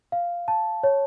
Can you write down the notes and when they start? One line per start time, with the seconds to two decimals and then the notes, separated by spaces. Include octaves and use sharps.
0.12 F5
0.48 A5
0.83 C#5